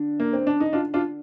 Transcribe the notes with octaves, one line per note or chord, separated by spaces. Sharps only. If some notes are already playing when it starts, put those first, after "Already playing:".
Already playing: D3 D4
A#3
C4
D4
D#4
D4 F4
D4 F4